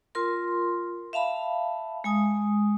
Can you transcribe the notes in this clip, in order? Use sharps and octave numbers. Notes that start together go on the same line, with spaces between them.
F4 A#4 C6
E5 F5 A5 B5
G#3 G#5 D#6